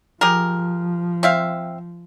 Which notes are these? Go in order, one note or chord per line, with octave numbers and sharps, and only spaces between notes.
F3 G4 G#4 A#4
C4 E5 F5